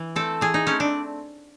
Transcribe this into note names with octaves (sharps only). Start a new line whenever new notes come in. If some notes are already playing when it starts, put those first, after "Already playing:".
Already playing: E3
A3 C4 A4
E3 G#4
D#4
A3 C4 C#4
D4